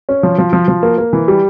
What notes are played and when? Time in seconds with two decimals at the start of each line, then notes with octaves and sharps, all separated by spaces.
0.09 C#4
0.23 F3
0.38 F3
0.53 F3
0.68 F3
0.83 A#3
0.98 A#3
1.13 E3
1.28 G3